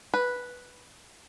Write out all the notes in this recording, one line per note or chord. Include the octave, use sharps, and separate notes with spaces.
B4